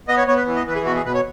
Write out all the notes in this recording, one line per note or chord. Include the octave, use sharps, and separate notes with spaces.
B3 D#5
C#5
B3 C#5
B4
E3
D#5
E3 B4
G#4
B2 F#4
G#4
B2 B4
C#5